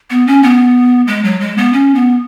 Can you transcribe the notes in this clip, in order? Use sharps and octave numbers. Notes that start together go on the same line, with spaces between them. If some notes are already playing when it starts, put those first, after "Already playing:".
B3
C#4
B3
G#3
F#3
G#3
B3
C#4
B3